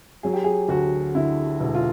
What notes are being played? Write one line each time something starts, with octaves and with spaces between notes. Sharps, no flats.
F#3 G#4
G4
G#4
D2 F#4
D3 E4
E1
F4